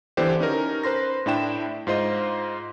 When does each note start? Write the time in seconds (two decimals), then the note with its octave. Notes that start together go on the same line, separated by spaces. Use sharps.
0.17 D3 E3 B3 D4 G4 C5
0.40 C#4 D#4 A#4
0.83 B4 C5 C6 A#6
1.26 A2 D4 E4 G5 E7
1.87 G#2 F4 C5 D#5 C6